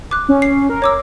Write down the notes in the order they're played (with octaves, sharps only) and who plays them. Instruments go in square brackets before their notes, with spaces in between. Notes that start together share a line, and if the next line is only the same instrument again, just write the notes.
[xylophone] D6 F#6
[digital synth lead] C#4
[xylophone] C7
[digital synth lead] A#4
[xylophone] C#5 D6 E6